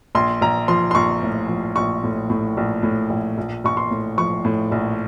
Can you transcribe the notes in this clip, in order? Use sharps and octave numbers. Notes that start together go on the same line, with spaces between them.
A#1 C6
A#1 A#5
F3 C6
C6
A#1 C#6
A2
F3
A#1 C#6
A2
A2
A#1
A2
A#1
A#1
A#1 C#6
C6
A2
F3 C#6
A2
A#1